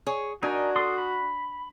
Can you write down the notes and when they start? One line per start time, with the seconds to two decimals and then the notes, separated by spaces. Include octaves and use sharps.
0.07 G#4 C#5
0.43 D4 D#4 F#4 A#4 G#5
0.76 A4 C6 D#6
0.98 B5